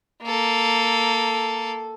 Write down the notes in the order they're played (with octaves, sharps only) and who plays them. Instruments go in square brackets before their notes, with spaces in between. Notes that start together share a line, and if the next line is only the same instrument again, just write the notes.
[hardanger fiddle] A#3 A4